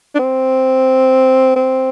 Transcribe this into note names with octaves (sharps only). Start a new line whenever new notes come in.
D4
C4
C4